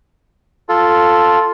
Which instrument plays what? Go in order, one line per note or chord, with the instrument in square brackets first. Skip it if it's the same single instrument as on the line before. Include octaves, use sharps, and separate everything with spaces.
[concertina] F4 A4